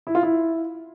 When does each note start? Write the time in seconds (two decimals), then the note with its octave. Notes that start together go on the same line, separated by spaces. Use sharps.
0.07 E4
0.15 F4
0.23 E4